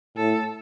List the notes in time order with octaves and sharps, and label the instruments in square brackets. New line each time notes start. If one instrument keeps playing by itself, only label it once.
[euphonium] A2 [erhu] A4